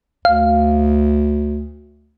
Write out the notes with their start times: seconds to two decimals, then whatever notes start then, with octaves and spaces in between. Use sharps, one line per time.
0.25 D2 F5